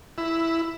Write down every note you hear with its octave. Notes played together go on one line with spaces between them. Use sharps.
E4